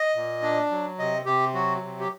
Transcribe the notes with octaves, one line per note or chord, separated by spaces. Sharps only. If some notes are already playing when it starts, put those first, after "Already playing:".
Already playing: D#5
A#2
D4
F#3
C3 D#5
C3 G4
F#3 F#4
C3
G4